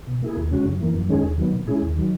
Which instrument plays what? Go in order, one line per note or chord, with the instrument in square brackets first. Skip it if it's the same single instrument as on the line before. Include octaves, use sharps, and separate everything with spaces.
[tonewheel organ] B2
A#3 E4 G#4
D#2
C#3 G#3 C#4 F#4
F#2
E3 A#3
F#2
D#3 G#3 C#4 G#4
D#2
D#3 F#3 B3
A#2
G#3 C#4 E4 G#4
D#2
D#3 F#3